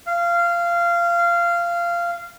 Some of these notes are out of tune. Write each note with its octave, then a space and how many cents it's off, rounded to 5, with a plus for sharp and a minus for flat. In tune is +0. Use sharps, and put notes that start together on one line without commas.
F5 -20